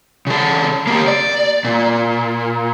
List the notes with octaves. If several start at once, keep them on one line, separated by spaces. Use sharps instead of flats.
C#3 A4
A#3 G4
D5
A#2